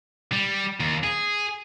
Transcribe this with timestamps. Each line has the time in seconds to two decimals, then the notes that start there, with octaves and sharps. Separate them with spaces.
0.32 G3
0.80 D#2
1.03 G#4